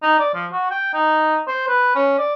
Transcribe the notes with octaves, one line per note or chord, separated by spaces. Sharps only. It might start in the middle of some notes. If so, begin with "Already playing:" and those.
D#4
D5
F3
F#4
G5
D#4
C5
B4
C#4
D5